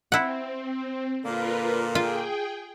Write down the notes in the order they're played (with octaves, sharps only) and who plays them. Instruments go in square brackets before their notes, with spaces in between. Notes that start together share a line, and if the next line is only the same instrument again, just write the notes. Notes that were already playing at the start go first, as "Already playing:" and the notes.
[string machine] C4 [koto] E4 F#5
[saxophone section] A#2 D3 A#3 [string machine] F4 A#4 B4
[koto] F4 [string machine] G#4 G5